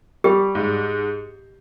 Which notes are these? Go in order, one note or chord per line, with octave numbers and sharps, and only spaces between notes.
G3 G4
G#2